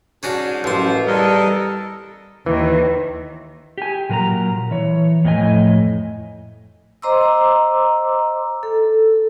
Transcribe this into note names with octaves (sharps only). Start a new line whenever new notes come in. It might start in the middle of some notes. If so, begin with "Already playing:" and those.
G#2 C#4 D4 F#4
A1 F#2 F3 C6
E2 G3 A4 A#4 D#5
D#2 D#3 E3
G4 G#5
A#2 F#3 A#4 A5 A#5
E3 C#5
F2 A2 C#5 D#5 G#5
C5 D#5 A#5 C6 D6 E6
A4